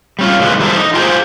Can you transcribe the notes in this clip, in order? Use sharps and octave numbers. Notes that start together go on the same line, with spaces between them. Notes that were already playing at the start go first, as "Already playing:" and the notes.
G3 C#4 F4
D3 D#3 G3 G#3 D#4 B4
E3 G3 F#4 A4 C5
D#4
F4 G4 G#4 C5